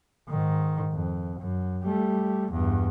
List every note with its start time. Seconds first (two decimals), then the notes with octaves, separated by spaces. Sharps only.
0.29 G#2 D#3
0.93 F2
1.39 F#2
1.84 G3 A3
2.51 E2 G2